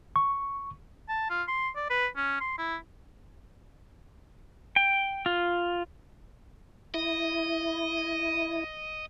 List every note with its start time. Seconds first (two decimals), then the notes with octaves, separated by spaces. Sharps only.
0.16 C#6
1.09 A5
1.30 F4
1.48 C6
1.76 D5
1.90 B4
2.16 C#4
2.41 C6
2.58 E4
4.76 G5
5.26 F4
6.94 E4 D#5